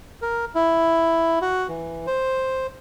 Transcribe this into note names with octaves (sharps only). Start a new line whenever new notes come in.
A#4
E4
F#4
E3
C5